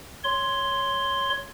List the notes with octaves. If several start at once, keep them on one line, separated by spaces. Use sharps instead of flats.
C#5 C6